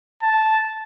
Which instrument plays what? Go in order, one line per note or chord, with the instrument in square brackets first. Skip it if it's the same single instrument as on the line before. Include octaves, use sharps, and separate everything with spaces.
[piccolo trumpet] A5